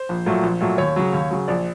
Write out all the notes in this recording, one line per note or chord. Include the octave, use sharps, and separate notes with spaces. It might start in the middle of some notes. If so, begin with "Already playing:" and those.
Already playing: C5
A#1
A#2 F#3 A3
A#1
A#2 F#3 A3
D#2 C#5
C#3 F#3
D#2
C#3 F#3
A#1 D5